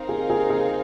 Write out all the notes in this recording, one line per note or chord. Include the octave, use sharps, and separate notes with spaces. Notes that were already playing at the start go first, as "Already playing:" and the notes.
Already playing: C4 D#4 A#4 F5
G#4
G#4
G#4